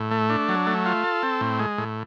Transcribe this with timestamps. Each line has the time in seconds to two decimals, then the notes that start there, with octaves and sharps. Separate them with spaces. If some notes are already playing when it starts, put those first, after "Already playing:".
Already playing: A2
0.11 A3
0.30 D4
0.49 F#3
0.67 A3
0.86 F4
1.04 A4
1.23 C4
1.41 A2
1.59 G#3
1.78 A2